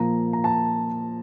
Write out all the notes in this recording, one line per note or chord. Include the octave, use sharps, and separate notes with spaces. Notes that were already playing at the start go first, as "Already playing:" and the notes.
Already playing: A#2 F3 A#3 A#5
A#5
A5